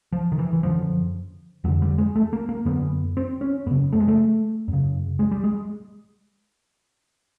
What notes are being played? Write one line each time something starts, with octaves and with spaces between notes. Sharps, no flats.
F3
D#3
E3
E3
F#2 D3 F3
F2 D3 F#3
G3
G#3
A3
A#3
A#3
F#2 D3 B3
C4
C#4
F#2 C#3 B3
A3
G#3
A3
F#2
C#3
G#3
G3
G#3